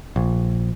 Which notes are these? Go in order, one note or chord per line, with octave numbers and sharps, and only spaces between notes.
A#1